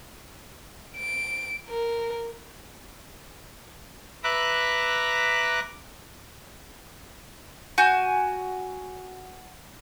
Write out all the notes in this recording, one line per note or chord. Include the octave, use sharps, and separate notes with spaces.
D7
A#4
B4 E5 A#5 D6 F#6
F#4 G#5 G6